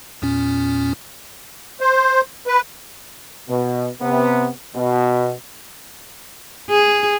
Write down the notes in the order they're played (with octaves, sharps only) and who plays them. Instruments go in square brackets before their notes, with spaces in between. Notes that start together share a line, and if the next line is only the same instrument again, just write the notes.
[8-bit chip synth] E2 A#2 C#4
[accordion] C5
B4
[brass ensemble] B2
C3 B3
B2
[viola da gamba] G#4